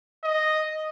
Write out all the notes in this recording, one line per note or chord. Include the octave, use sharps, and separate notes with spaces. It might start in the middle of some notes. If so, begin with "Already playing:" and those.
D#5